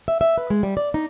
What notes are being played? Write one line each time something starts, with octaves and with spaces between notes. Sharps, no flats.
E5
E5
B4
G#3
G3
D5
D#4